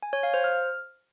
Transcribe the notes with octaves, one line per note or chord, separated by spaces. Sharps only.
G#5
C#5
F5
C5
F6